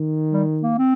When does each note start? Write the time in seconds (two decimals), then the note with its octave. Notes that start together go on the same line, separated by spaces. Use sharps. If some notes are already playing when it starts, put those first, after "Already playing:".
Already playing: D#3
0.33 G3
0.63 A#3
0.78 C4